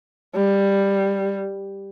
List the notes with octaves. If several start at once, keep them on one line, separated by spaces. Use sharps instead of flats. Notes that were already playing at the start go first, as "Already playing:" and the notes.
G3